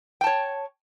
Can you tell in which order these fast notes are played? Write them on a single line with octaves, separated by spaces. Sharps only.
G5 A5 C#5